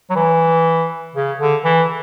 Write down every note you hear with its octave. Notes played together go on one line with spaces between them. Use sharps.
F#3
E3
C#3
D3
E3